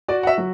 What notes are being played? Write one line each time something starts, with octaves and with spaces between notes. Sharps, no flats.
F#4 D5
F#5
E5
F#3